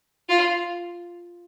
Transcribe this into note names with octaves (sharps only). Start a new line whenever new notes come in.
F4